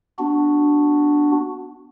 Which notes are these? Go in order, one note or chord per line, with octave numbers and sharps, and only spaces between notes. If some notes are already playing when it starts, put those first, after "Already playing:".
B3 D4 F#4